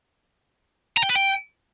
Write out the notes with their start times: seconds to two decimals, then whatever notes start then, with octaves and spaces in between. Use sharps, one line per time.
0.97 A#5
1.03 G5
1.10 B4
1.16 G5